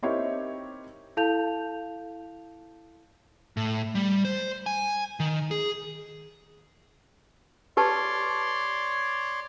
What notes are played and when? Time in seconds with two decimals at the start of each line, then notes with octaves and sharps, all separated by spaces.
0.03 C4 D#4 E4 G4 A#4 C#5
1.17 E4 A4 F5 A5 G6 F7
3.57 A2
3.95 G3
4.25 C5
4.66 G#5
5.20 D#3
5.51 G#4
7.77 G4 B4 C#5 D5 A5 C6